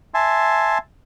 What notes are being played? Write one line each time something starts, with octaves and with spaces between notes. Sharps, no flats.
E5 G#5 A5 C6